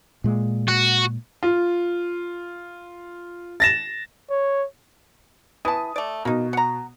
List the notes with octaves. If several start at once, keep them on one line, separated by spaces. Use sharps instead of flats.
A#2 G#3
F#4
F4
A6 A#6 E7
C#5
E3 A5 D#6
A3 D5
B2 A#3 D#4
F#5 A#5